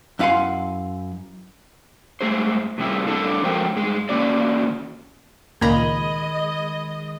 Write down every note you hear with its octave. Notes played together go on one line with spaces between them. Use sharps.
F#2 E4 F5 F#5 G#5 C6
G2 G#3 A3 G#4 C5
A2 C3 G3 C4 E4 G#4
F#2 A2 G3 D4 A4 A5
F3 F#3 G#3 A#4 C5 G5
G2 G#3
E2 D3 A#3 C#4 F#4 D5
C#2 A#2 D#3 G#3 D#5 A#5 B5 G#6